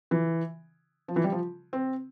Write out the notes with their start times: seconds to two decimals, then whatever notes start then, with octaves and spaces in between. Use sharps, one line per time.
0.11 E3
1.08 F3
1.16 E3
1.24 G3
1.32 F3
1.73 C4